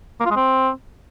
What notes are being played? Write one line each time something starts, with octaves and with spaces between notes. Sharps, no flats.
A#3
F4
G#3
C4